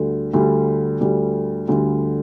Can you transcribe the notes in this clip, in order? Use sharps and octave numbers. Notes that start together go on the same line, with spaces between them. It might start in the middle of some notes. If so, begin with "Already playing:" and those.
Already playing: D2 D3 G3
D2 D3 G3
D2 D3 G3
D2 D3 G3